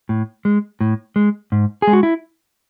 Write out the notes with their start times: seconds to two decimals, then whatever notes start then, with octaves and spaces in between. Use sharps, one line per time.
0.09 A2
0.45 G#3
0.81 A2
1.16 G#3
1.52 G#2
1.82 G#4
1.87 G#3
1.93 F#4
2.03 E4